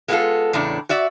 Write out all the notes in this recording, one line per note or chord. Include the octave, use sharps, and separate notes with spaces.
G#3 A#3 B3 E4 F4 A4
E2 A2 C#3 D4
F#4 D5 E5